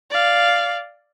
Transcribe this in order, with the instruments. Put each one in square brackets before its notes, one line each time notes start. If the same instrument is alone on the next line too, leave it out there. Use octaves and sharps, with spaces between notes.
[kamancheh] D5 F5